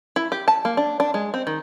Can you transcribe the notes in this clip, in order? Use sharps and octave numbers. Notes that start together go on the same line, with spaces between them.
E4
G4
A5
A#3
D4
D4
G#3
C4
D#3